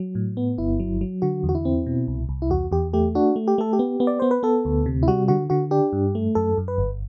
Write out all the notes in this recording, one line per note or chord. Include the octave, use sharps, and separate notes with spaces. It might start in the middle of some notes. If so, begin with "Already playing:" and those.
Already playing: F#3
A2
B3
G1 E4
F#3
F#3
D3 F#4
E2
F#4
E4
C4
B2
C2
C2
E4
E2 F#4
E2 G4
A3 G4
D4 F#4
A3
G4
A3 A4
G4
B3
B3
D5
B3 C5
B4
B3 A4
D2
C3
E4
G3 F#4
D3 F#4
D3 F#4
D4 G4
G2
A3
F#2 A4
F#2
B4
G1